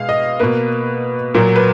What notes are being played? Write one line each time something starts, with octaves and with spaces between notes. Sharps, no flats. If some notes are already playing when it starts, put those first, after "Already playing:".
Already playing: B2 G#3 F5
D#5
B2 A#3 B4
A#2 F#3 A#3 A#4
B4